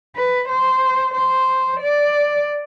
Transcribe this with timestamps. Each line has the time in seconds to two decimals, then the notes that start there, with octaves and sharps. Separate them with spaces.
0.16 B4
0.49 C5
1.15 C5
1.81 D5